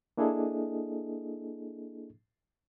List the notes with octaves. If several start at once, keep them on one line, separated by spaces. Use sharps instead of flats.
A#3 D4 E4 G#4 A4 D#5